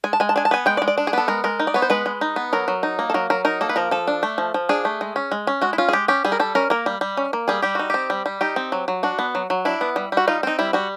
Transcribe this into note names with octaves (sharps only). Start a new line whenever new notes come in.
G#3 G#5
A5
G#3 G#5
A5
D4 G#5
A5
B3 G#5
G#3 G5
D5
G#3
D5
D4
G#4
B3 A4
G#3 A#4
G#3 A#4
D#4
D5
B3 C#5
C5
G#3 B4
G#3
D#4
B3
F#3 A#4
F#3
D#4
A#3
A4
F#3 A#4
F#3 A#4
D#4 A#4
A#3 A4
B4
F3 A#4
F3 A4
D4
A3
F3
F3
D4 G#4
A3
G#3
C#4
G#3
C#4
G#3 F#4
E4
C#4 F4
G#4
G#3 G4
C#4 G4
G3 G#4
A#4
G3 A4
C#4 A#4
A#3 A#4
G3
G3
C#4
A#3
G3 G#4
G3 G4
D#4 F#4
C4 G4
G3
G3
D#4 G4
C4
F#3
F#3
D4 F#4
B3
F#3
F#3
D4 E4
B3
G3
G3 F#4
D#4 F4
C4 D#4
G3 E4
G3 F#4